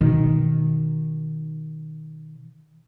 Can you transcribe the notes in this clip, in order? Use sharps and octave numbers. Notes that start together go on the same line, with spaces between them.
B2 D#3